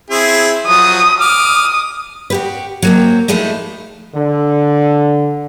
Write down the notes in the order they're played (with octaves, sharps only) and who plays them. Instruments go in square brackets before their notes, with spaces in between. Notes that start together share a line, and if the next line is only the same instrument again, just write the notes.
[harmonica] C4 E4 G#4
[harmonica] F3 F#3 [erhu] D#6
[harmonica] D6 F6 [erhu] D#6
[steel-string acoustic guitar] F#4 G4 B4
F#3 A#3 C4
F3 G#3 A3 D#4 E4
[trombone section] D3